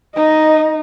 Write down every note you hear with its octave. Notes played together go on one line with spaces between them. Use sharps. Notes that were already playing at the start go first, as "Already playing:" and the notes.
D#4 D#5